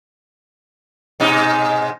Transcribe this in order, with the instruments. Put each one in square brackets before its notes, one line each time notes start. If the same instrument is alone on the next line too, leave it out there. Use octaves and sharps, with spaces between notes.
[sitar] G#2 B2 D#4